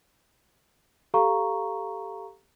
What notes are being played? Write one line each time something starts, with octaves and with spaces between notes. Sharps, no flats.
G4 A4 F5 A#5 C#6